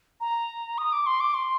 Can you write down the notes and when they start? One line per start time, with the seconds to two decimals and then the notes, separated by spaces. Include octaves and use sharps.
0.21 A#5
0.78 D#6
0.92 D6
1.06 C6
1.20 D6
1.34 C6